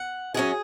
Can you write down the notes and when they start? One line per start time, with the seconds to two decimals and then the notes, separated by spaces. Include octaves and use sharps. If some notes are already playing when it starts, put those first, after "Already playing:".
Already playing: F#5
0.34 F#2 F#3 C#4 G#4